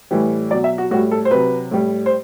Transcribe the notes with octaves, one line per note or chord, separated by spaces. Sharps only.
A2 E3 G3
B2 F#3 D5
E5
F#4
A2 G3 F#4
A4
C5
C3 F#3 B4
A2 G3
C5